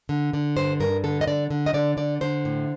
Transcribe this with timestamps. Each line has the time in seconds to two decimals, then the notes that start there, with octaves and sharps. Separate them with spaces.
0.09 D3
0.33 D3
0.56 G2 C5
0.80 G2 A#4
1.04 D3 A4
1.21 D#5
1.27 D3 D5
1.51 D3
1.66 D#5
1.74 D3 D5
1.97 D3 D5
2.21 D3 C5
2.45 A2